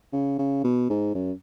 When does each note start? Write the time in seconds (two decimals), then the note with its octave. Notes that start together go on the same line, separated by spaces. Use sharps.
0.13 C#3
0.39 C#3
0.64 B2
0.90 G#2
1.15 F#2